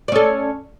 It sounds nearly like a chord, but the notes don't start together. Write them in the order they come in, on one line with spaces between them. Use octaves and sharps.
D5 C#4 A4